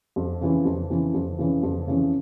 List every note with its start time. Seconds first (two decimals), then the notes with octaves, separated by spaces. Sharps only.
0.16 F2
0.41 C#3 E3
0.65 F2
0.89 C#3 E3
1.14 F2
1.38 C#3 E3
1.63 F2
1.87 C#3 E3